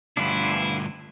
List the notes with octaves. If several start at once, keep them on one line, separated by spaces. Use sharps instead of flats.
D2 G2 D4 E4 F4 B4